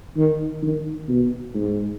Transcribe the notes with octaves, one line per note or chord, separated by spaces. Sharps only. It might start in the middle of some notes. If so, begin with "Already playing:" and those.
D#3
D#3
B2
G#2